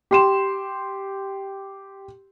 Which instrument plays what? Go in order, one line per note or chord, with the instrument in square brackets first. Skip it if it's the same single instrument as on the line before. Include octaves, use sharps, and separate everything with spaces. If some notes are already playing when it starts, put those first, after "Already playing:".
[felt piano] G4 C6 E7